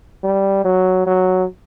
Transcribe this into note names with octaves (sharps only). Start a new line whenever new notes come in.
G3
F#3
F#3